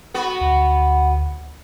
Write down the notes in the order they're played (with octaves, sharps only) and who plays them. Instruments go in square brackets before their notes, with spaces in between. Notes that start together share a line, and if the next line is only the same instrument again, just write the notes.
[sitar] B3 F#4 B4
[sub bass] D2